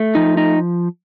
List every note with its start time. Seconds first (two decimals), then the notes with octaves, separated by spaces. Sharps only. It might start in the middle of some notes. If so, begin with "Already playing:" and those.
Already playing: A3
0.15 F3 D#4
0.37 D#4